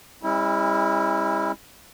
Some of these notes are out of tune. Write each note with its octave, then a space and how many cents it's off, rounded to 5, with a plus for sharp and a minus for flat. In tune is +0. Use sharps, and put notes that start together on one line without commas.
G3 +45 C#4 -45 E4 -20